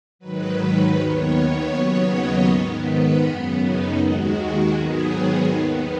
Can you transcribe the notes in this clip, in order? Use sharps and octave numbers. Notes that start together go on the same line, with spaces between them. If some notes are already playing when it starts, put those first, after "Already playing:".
G#2 D#3 F#3 B4
D#2 D#3 B3 C#5
C#5
D#2 C#3 F#3 B3 C#5
D#5
G#2 D#3 B3
B4
F#2 C#3 B3
D#4
D#2 D#3 G#3 F#4
G#2 D#3 F#3 B3 G#4
D#2 D#3 B3